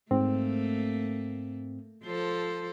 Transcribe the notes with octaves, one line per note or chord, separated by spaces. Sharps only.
G#2 A3 A#3 C4
F3 A4 C5